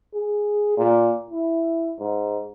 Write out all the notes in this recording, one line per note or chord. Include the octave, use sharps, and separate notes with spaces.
G#4
A#2
E4
G#2